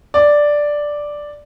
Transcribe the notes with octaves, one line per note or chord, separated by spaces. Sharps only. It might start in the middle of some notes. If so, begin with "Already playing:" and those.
D5